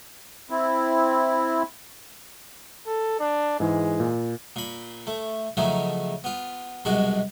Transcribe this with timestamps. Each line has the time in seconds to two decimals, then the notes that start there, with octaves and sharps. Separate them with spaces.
0.50 C4 E4
2.86 A4
3.19 D4
3.60 G#2 E3 G#3
4.00 A#2
4.56 A#2 B5
5.07 A3
5.57 C#3 F3 F#3 A3 D#4
6.24 B3 F4
6.85 C2 F#2 B2 G#3 F#4